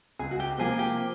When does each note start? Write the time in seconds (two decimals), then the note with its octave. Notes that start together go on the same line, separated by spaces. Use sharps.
0.19 C#2 G#4
0.31 F#4
0.40 G4
0.58 C3 F3 A#3 G#4
0.79 G4